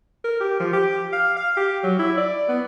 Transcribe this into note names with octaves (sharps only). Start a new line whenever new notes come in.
A#4
G4
F3
G4
F5
F5
G4
F#3
E4
D5
B3